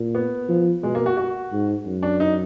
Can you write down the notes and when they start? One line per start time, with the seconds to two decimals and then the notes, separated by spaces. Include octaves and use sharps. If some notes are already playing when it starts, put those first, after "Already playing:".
Already playing: A#2
0.15 B3
0.49 F3
0.83 B2 G#3
0.95 A#3
1.06 F#4
1.17 F#4
1.52 G#2
1.86 F#2
2.03 D4
2.20 D#4